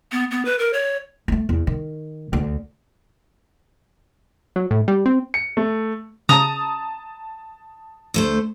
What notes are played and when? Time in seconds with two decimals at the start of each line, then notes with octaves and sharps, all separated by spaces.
0.12 B3
0.31 B3
0.45 B4
0.59 A#4
0.73 C#5
1.28 G#3 A3
1.49 E2
1.67 D#3
2.33 D2
4.56 F#3
4.71 A2
4.88 G3
5.06 C4
5.34 C#7
5.57 A3
6.29 C#3 A5 A#5 D#6
8.14 D2 A3 C5